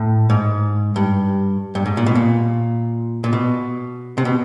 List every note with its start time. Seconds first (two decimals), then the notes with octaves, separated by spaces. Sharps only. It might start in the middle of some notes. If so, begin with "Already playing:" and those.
Already playing: A2
0.30 G#2
0.96 G2
1.75 G2
1.86 G#2
1.97 A#2
2.06 B2
2.15 A#2
3.24 A#2
3.33 B2
4.18 C3
4.25 B2